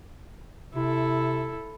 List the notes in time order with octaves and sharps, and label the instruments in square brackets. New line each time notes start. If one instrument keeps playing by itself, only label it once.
[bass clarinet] C3 [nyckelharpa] E4 A4